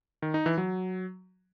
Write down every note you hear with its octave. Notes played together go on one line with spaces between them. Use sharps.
D#3
D#4
E3
F#3